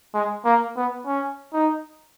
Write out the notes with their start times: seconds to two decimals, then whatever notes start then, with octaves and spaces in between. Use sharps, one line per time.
0.14 G#3
0.45 A#3
0.77 B3
1.06 C#4
1.53 D#4